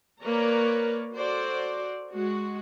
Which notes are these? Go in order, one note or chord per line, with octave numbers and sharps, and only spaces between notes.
A#3 A#4 B4 C#5 D5 A#5
F#4 A4 C5 D5
G#3 F#4